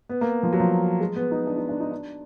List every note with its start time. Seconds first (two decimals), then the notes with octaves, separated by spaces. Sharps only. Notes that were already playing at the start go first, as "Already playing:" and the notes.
0.09 B3
0.21 A#3
0.43 F3
0.53 F#3
0.60 F3
1.00 G#3
1.16 B3
1.31 D#4
1.47 D4
1.57 D#4
1.69 D4
1.80 D#4
1.91 D4